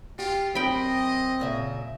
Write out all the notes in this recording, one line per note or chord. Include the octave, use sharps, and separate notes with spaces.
F4 G4
F#2 C4 D#5 G5 B5
A#2 C#3 E5